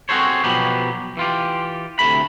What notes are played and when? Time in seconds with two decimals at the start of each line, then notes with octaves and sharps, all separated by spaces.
0.09 C4 F#4 G#4 A4 C5 C#5
0.44 B2 F3 F#3 B3 G4
1.17 E3 F4 G4
1.99 D2 G#2 C3 A3 B5